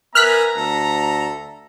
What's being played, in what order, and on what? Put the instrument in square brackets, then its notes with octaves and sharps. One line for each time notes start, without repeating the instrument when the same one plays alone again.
[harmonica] B3 E5 G#5 [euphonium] A#4 [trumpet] A#5 [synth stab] F6 F#6 B6
[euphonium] D2 [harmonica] A4 E5